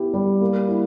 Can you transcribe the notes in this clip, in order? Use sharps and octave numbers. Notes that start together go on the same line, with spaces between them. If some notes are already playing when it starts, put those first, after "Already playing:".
Already playing: B3 E4 G4
G3
A#3
E4